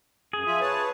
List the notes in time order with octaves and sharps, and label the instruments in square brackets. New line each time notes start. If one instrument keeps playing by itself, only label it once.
[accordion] F#2 [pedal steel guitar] G#4
[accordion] F3 F4 E5
B4 C#5 A5